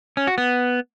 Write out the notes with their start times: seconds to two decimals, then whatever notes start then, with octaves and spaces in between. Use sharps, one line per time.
0.17 C#4
0.27 F#4
0.38 B3